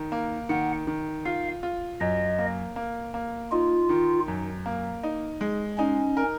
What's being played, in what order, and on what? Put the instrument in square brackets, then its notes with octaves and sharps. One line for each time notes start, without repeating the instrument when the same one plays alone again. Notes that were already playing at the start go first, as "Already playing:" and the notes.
Already playing: [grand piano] D#3
A#3
[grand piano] D#3 [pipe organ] F#5
[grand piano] D#3
[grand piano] F4 [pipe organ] F5
[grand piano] F4
[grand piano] F#2 [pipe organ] D#5
[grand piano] A#3
A#3
A#3
[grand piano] D#4 [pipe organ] F4
[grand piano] D#3
F#2
A#3
D#4
G#3
[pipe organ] C#4 [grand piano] D#4
[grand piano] A#4